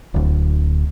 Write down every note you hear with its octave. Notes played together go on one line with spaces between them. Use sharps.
D1 D2